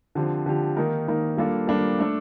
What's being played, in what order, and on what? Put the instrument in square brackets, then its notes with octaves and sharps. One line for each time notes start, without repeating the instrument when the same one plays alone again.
[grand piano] D3 F3 C4 G4
D3 F3 C4 G4
D#3 A#3 D#4 A#4
D#3 A#3 D#4 A#4
G3 A#3 D4 F4 A4
G3 A#3 D4 F4 A4
A3 D4 A4